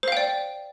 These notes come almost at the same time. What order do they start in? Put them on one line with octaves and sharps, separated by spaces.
C5 F5 G5 D5